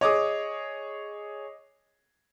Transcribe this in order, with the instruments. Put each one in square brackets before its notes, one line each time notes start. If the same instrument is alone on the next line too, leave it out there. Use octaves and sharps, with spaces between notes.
[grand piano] G#4 C#5 [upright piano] D#5 D6 D#6